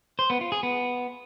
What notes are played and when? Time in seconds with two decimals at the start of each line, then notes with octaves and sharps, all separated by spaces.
0.19 C5
0.30 B3
0.41 F4
0.52 G#4
0.63 B3